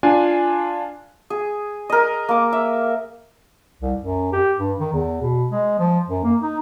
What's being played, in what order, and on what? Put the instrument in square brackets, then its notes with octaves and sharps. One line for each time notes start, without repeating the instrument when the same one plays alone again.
[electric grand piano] D4 F4 G#5
[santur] G#4
A#4 D#5
A#3 D6
E5
[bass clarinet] C2
F#2
G4
G2
D#3
E2
B2
G#3
F3
F#2
A#3
D#4